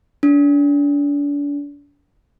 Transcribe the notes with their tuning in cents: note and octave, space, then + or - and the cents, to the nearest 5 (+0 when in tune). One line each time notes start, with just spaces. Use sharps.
D4 -35